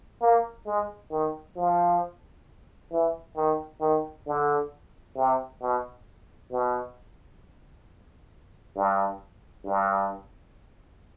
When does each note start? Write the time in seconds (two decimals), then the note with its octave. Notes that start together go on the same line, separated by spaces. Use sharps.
0.21 A#3
0.66 G#3
1.11 D#3
1.56 F3
2.92 E3
3.36 D#3
3.81 D#3
4.27 D3
5.16 C3
5.62 B2
6.51 B2
8.76 G2
9.66 G2